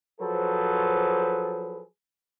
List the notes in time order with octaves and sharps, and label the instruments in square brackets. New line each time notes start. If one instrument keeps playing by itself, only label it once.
[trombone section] F3 F#3 G#4 A4 B4 C5